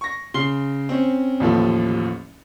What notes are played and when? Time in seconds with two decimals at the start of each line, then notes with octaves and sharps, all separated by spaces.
0.01 C#6 A#6
0.34 C#3 C6 C7 G7
0.89 C4 C#4
1.40 A1 D#2 F3 A4